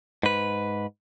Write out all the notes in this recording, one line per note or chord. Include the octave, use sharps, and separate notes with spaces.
G#2 B4